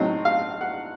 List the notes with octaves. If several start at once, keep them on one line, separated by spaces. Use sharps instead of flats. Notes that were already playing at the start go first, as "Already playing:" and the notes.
Already playing: A2 F#3 C4 D#4 D#5
F5
F#5